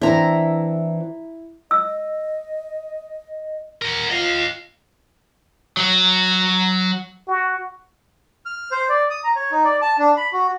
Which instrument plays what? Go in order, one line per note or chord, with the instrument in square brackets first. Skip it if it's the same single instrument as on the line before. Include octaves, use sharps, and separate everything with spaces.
[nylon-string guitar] E3 C4 D4 [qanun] E4 A#5
[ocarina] D#5 [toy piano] E6
[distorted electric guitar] A#4 F#5
[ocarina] F4 [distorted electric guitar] D#5 F5
[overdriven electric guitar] F#3 F#4
[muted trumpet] F#4
[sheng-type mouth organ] F6
C5
D5
D#6
A#5
C#5
D#4
D5
A5
D4
B5
F#4